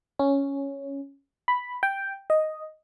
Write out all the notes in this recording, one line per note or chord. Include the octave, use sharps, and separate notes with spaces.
C#4
B5
G5
D#5